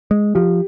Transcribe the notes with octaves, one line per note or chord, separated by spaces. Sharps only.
G#3
F3 G4